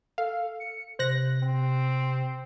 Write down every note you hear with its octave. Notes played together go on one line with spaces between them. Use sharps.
A4 F5
C#7
C3 C5 F#6 A#6
C4